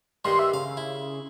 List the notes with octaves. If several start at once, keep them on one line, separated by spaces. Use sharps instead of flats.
G2 D#3 G3 C6
E5
C#3 F5
E4